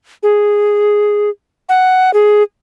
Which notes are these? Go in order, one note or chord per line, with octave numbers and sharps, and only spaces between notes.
G#4
F#5
G#4